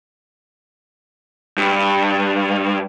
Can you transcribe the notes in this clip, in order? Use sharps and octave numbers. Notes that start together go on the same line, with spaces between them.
G2